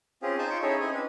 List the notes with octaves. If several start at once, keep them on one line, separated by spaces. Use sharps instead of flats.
C4 C#4 F4 G4 G#4
D#4 C5 G#5 A5
F4 G5 C#6
C#4 D#4 E4 G#4 A4 C#5
C4 C#4 E4 D#5 G#5
C#4 D4 B4